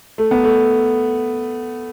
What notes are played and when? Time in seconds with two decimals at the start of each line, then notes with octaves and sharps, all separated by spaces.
0.18 A3
0.31 B3
0.44 A3